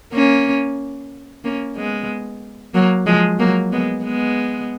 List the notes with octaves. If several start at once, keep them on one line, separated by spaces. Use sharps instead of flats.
A#3 C#4
A#3 C#4
G#3 B3
F#3 A#3
F3 G#3
F#3 A#3
G#3 B3
G#3 B3